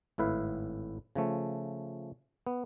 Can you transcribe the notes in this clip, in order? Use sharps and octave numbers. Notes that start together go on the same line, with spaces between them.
G#1 A2 E4 B4 F5
C#3 F3 A3
B3